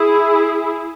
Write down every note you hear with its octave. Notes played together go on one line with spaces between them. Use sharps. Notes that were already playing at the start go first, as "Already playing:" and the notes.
Already playing: E4 G#4